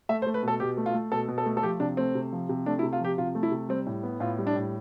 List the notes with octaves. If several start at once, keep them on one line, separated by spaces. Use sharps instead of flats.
A3 E5
C5
A3
B4
B2 A4
B2 G4
A3
F4
A3
B2 A4
B2
A4
A3
A4
F3 G4
C3 D4
A3 C4
C3
F3
C3
A3 D4
E4
C3
F4
F3 G4
C3 F4
A3
E4
C3
G3 C4
A2
B3
A2 F4
G3
D4
A2